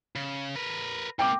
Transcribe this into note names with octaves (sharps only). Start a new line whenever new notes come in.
C#3
A#4 B4
G#2 A#3 G5 D6